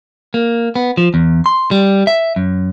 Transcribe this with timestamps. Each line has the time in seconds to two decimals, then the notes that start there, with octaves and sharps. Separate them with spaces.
0.34 A#3
0.76 B3
0.97 F3
1.14 E2
1.46 C6
1.71 G3
2.07 E5
2.36 F#2